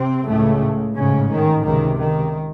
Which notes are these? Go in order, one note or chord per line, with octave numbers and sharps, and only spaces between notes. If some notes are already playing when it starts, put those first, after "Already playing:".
Already playing: C3 C4
C#2 A2 C#3 A3
A1 G#2 C#3 C#4
D#3
C#2 C3 D#3
D#3